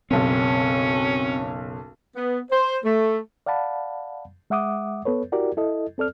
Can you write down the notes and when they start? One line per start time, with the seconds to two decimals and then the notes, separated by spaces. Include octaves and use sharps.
0.11 F#1 B1 C4 C#4
2.16 B3
2.51 C5
2.84 A3
3.46 D5 F5 F#5 A5 B5
4.50 G#3 E5 F#5 D6 D#6
5.05 B3 A4 B4 C#5
5.32 E4 F#4 G4 A#4 D5
5.57 E4 A4 D#5
5.98 C4 A4 D5 F6